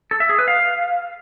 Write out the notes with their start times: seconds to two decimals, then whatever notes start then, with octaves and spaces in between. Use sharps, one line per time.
0.11 A4
0.20 E5
0.29 G#4
0.39 B4
0.48 F5